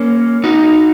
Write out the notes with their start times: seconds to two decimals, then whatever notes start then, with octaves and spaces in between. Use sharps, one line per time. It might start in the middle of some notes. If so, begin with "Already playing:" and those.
Already playing: A#3 C#4
0.44 D#4 F#4